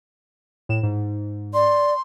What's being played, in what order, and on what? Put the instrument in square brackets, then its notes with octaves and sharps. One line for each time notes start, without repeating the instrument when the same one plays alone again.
[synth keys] A2 E7
G#2
[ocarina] D5 [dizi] C6